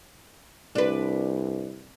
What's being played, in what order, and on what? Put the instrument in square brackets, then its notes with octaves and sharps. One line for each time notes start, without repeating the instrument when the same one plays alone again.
[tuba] C2 [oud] D4 B4